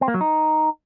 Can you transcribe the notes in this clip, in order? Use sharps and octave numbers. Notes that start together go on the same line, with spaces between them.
C4
A#3
F#3
D#4